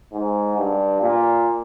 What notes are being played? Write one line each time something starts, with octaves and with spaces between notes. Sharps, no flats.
G#2
G2
A#2